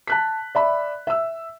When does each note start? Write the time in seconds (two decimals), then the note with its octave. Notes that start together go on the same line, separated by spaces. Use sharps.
0.07 A5 F#6 B6
0.55 D5 E5 B5
1.07 E5 E6